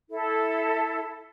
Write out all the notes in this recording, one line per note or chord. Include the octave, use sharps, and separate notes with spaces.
E4 A4